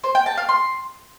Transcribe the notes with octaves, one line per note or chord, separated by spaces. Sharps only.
C5
G5
A5
F5
C6